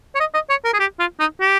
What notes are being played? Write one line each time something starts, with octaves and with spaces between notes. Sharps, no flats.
C#5
D#5
D#5
C#5
A#4
G#4
G4
F4
D#4
G4